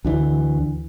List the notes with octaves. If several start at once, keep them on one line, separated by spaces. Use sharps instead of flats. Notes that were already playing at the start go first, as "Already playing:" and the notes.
D2 D3 E3